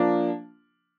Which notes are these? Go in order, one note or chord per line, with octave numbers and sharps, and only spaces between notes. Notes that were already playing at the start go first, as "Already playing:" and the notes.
Already playing: F3 A#3 D4